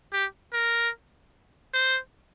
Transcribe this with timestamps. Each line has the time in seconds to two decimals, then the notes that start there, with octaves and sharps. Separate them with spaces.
0.13 G4
0.53 A#4
1.74 C5